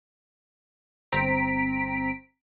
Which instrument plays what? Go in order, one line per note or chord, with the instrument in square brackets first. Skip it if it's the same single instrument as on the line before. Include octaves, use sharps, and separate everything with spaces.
[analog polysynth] G1 C4 A#5 B6 D7